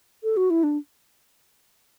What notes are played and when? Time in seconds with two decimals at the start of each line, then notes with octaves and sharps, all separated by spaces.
0.23 A4
0.37 F#4
0.50 E4
0.63 D4